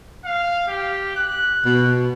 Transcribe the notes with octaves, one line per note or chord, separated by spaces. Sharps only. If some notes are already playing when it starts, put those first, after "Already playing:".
F5
G4
F#6
B2